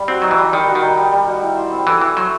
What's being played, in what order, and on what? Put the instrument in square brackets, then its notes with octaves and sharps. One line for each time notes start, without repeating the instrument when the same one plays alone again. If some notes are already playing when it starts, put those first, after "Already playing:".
Already playing: [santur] G3
[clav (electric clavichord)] C4 [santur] F#4
[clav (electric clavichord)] F#3 [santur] D#4
[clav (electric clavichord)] E3
[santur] G3
[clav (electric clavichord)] D#3 [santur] G3
[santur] F#4
[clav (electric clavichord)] D#3
[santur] D#4
G3
G3
F#4
E4
C5
C4
[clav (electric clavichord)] E3 [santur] A4
[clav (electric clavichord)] E3 [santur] E4
[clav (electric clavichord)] F#3 [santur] C5